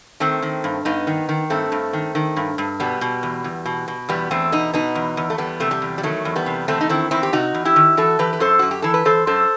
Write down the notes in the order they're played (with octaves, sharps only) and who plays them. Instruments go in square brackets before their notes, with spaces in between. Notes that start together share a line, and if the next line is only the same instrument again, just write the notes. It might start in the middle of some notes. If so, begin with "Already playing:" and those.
[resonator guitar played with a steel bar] D#3 A3 C4
D#3
G2
G2 B3 D#4
D#3
D#3
G2 A3 C4
G2
D#3
D#3
G2
G2
B2 G3 B3
B2
E2
E2
B2
B2
E2 G3 B3
E2 A3 C4
B2 B3 D#4
B2 B3 D#4
E2
E2
A3
E2 G3 B3
C3 A3
G3
E2
G3
D#3 F#3 A3
E2
G3 B3
C3
E2 A3 C4
D#4
D#3 C4 E4
E2 C4 E4
G4
C3 D#4 F#4
E2
E4 G4
D#3
E3 F#4 A4
E3 G4 B4
B4
F#2 A4 C5
F#2 F#4
G4
E3 A4
B4
E3 A4 C5
F#2 A4 C5